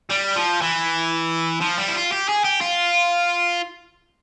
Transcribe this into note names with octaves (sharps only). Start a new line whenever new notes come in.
G3
F3
E3
F3
G3
E4
F4
G4
G#4
G4
F4